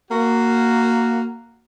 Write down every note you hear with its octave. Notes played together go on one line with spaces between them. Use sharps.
A#3 F#4